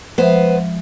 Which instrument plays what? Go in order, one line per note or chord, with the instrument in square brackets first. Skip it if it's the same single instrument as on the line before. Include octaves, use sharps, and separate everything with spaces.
[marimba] F3 G#3 E5 [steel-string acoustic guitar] B3 C5